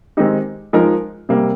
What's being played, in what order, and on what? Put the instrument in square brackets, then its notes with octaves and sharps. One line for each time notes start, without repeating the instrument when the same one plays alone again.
[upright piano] D#3 G#3 C4 D#4 G4
F3 G#3 D#4 A#4
C3 G3 A#3